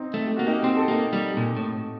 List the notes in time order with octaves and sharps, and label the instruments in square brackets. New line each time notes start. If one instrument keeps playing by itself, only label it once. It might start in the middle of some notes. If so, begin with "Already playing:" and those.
Already playing: [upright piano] C4 D#4
[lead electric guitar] A3
[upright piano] G4
[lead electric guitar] A#3 [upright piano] F#4
[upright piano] D#4 G4
[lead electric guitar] C4 [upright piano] G4
[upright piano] A4
[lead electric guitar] A#3 [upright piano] D#4 G4
[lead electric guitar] G3
A#2
A2